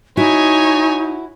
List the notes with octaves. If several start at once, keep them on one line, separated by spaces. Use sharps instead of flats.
D#4 E4 F#4 C#5 G#5